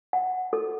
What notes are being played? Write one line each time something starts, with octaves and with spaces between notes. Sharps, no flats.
F#5
A4